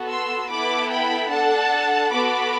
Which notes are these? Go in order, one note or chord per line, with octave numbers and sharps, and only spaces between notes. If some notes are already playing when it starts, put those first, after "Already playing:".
Already playing: B3 F#4 A4
C6 E6
B3 E4 A4 B5 D6
G5 B5
D4 A4 F#5 A5
B3 F#4 A4 B5 D6